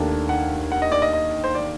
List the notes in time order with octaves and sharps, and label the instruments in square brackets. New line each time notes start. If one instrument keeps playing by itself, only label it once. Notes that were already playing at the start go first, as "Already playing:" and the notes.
Already playing: [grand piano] D#2 D#3 A3 D4
[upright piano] F#5
F#5
D#5
D5
D#5
D#5
C5
D5